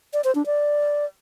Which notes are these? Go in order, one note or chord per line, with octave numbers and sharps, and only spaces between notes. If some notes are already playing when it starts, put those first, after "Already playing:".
D5
C5
D4
D5